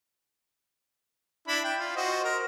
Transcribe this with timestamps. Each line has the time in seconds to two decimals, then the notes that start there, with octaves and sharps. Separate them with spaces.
1.48 D4 E4 B5
1.64 G5
1.78 F4
1.96 F#4 C5 D#5
2.24 A#4